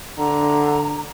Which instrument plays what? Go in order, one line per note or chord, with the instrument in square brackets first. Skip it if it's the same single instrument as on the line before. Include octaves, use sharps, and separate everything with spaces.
[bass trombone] D3 [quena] A#5